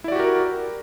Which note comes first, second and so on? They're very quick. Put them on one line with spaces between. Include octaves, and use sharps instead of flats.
E4 D5 F#4 G4 A#4